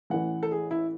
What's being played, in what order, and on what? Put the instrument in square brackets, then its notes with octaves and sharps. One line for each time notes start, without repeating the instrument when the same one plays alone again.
[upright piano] A1 A2 E3 F#5
A4
G#4
E4